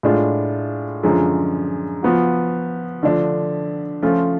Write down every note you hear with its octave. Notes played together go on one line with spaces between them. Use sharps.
A2 G#3 D4 F4
F#2 D3 F3 G#3
F3 B3 F#4
D3 F3 A3 D4
F3 A3 C#4 F4